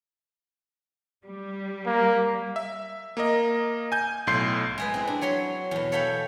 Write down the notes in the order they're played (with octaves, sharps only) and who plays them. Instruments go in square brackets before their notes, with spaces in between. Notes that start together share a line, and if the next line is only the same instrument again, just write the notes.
[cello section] G3
[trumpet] A#3
[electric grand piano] E5
A#3 A#4 D#5
G#5 G6
B1 A2 C6 C7
[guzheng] G#3 G#4 B4
C4 E4
D4
F#3 C#5 B5 C6
E2 B2
A4 C#5 E5 F5 G5 B5